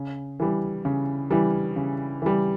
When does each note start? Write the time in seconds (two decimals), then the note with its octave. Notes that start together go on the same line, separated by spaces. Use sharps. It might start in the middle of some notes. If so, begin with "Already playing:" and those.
Already playing: C#3
0.40 E3 G3
0.85 C#3
1.31 E3 G3
1.76 C#3
2.22 E3 G3